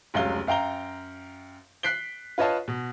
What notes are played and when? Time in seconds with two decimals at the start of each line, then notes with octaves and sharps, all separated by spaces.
0.14 F1 C#2 F#3 F5 G7
0.47 F#2 F5 G5 A#5 G7
1.83 F#6 B6 C7 D7 G7
2.38 F4 B4 C#5 D#5 F5 A5
2.68 B2